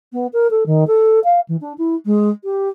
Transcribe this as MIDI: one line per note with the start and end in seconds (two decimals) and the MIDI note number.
0.13 0.27 59
0.33 0.50 70
0.50 0.64 69
0.66 0.87 51
0.87 1.20 69
1.24 1.40 77
1.48 1.56 52
1.61 1.73 62
1.78 1.95 64
2.06 2.29 56
2.44 2.69 67